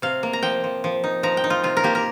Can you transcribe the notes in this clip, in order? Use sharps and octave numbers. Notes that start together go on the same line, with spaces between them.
C3 F5
A#3
A#5
F3 G5
F3
F3
D#4
F3 A#5
G5
D#4
F4
C3 F4
A#4
A#3 G4
A#4